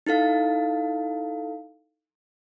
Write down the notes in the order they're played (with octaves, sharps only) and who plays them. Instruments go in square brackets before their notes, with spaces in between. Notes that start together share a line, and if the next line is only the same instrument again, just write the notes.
[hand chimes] D#4 E4 A4 F5